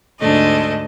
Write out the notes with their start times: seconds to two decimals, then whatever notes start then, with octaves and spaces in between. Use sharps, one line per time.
0.20 D2 G#2 G#3 A3 D4 D#5